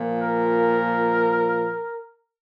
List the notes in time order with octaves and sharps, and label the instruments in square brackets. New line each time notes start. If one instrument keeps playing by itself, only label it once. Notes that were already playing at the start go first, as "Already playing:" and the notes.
Already playing: [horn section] A#2 F3
A#4